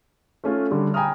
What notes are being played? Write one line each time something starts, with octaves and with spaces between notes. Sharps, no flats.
A3 C#4 F4
D3 G3
G5 G#5 A#5 B5 D#6 F6